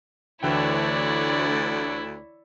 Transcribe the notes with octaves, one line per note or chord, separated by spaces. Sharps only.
D2 D3 E3 E4 C#5 D5 G5